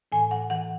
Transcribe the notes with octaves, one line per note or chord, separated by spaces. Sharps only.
A2 E3 G#5
F#5
A2 E3 F#5